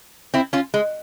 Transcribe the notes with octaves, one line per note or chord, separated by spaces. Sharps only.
C4 E4
C#4 F4
G#3